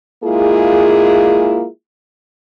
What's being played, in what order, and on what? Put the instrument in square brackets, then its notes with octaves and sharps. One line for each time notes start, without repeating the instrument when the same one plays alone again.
[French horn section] G#3 A#3 E4 F4 G#4